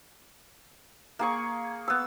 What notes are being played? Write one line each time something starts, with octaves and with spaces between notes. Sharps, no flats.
A#3 G#4 C#6
B3 E6